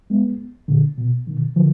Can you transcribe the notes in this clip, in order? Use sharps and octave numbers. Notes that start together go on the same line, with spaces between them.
G#3 B3
A#2 D3
B2
B2 D#3
D3 F3